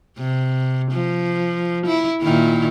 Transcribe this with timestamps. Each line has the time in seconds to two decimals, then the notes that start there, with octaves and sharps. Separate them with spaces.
0.18 C3
0.91 F3
1.87 E4
2.21 A#2 D#3 E4